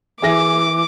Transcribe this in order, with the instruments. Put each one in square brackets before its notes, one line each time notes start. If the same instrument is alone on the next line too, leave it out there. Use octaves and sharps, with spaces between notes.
[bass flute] E3 [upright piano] E4 G#4 A#6 [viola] D6